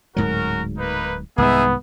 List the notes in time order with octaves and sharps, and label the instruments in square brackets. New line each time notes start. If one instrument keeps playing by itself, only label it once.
[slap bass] D1 G#2 F#3 [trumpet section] C#4 F#4 A#4
[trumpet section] A#3 D#4 B4
[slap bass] C2 G#2 D#3 [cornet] B3 [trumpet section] D#4 G#4 E5